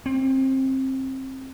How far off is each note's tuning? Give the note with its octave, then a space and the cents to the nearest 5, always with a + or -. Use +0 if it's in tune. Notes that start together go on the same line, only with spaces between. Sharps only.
C4 +25